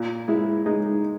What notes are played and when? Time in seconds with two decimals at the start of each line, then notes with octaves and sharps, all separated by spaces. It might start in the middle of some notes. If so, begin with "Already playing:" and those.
Already playing: A#2
0.28 G#3 E4
0.66 G#3 D#4